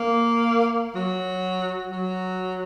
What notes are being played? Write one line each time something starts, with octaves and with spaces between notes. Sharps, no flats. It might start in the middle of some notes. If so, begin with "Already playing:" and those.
Already playing: A#3
F#3
F#3